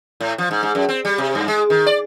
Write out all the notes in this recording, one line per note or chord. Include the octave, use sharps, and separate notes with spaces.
A2
F3
G#2
G#2
F#2
C4
G3
C3
G2
G#3
D#3
D5